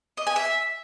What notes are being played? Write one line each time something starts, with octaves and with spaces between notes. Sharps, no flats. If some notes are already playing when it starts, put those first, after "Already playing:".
D#5
G#5
E5